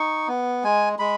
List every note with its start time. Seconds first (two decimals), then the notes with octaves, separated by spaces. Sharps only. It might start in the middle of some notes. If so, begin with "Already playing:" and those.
Already playing: D#4 C#6
0.28 B3
0.64 G#3 G#5
0.99 G#3 B5